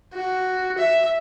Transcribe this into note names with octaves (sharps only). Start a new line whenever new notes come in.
F#4
E5